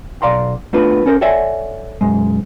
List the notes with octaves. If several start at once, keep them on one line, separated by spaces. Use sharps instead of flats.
B1 D5 F5 A#5 C6
A3 B3 D4 F4 B4
C#4 A4 A#4 C5
A4 C#5 D5 E5 F#5 G#5
B1 F#2 G#3